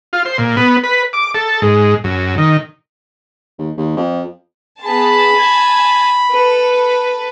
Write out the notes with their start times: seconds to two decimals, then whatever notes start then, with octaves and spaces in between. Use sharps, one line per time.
0.13 F4
0.25 C5
0.38 A#2
0.57 B3
0.83 B4
1.13 D6
1.35 A4
1.62 G#2
2.04 F#2
2.38 D#3
3.59 D#2
3.77 D#2
3.97 F2
4.81 B3 G#4 A5 B5
5.33 G#5 A5 G#6
6.31 A4 B4